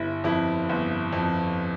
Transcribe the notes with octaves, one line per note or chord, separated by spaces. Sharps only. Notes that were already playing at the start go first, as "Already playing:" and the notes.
Already playing: G1 E4
F2 E4
G1
F2